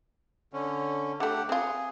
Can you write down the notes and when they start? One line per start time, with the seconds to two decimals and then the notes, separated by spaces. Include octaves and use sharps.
0.53 D3 C#4
1.20 D3 A3 G4 F#5
1.49 C4 F4 G#4